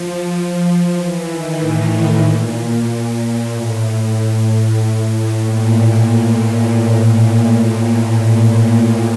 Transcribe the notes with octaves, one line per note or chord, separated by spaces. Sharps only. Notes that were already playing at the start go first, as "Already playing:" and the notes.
Already playing: F3
F3
E3
D#3
A2
A#2
A2
A#2